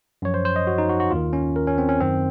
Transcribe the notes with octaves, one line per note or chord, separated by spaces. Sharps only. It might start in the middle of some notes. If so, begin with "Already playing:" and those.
F#2 F3 C#5
C5
C5
D#5
F#4
D#4
F#4
F#4
D#2 D#3 F4
C#4
A#4
C#4
C4
C#4
F#2 D#3 C4